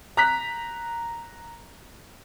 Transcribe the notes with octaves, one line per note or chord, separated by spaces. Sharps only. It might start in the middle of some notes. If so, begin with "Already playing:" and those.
A#5 F#6 B6